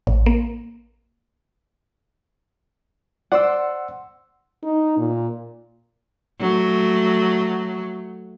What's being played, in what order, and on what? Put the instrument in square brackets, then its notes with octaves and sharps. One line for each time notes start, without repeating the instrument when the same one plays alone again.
[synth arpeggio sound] A1
A#3
[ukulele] C5 D5 [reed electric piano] F#5 C6 E6
[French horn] D#4
A#2
[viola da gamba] F#3 A3